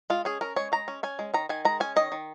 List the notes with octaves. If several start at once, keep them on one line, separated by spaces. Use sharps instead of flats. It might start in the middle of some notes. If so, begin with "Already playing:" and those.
G#3 F4
C#4 G#4
C#4 A#4
G#3 C#5
G#3 A#5
C#4
C#4 G#5
G#3
D#3 A#5
D#3 G#5
G#3 A#5
C#4 G#5
D#3 D#5
D#3